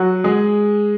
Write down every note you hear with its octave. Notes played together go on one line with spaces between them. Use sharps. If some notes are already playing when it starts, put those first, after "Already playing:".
Already playing: F#3 F#4
G#3 G#4